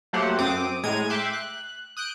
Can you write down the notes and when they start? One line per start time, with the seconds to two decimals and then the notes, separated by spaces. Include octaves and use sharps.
0.13 F#3 A3 A#3 G4 C5 F#5
0.39 F#2 C4 D6 D#6
0.83 A2 G#3 A#5 G#6 D#7
1.10 E5 G5 C6 D6 F#6
1.33 F#6
1.97 D#6 F#6 G6 D7